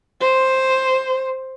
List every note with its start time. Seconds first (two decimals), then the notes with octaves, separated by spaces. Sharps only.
0.21 C5